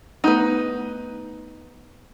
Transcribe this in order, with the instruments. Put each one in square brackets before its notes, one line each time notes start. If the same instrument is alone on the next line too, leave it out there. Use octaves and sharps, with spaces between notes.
[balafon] A3 B3 F#5 [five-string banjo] D#4 B4